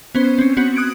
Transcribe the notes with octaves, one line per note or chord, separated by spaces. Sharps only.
B3 C#4 C5
C4 C#4
B3 C4 F#4 C#7
D#6 F#6 G#6 D7